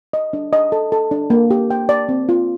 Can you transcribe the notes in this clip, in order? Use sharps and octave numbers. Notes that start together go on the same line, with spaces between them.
D#5
D4
D#5
A4
A4
D4
A#3
G4
G5
D5
C4
F4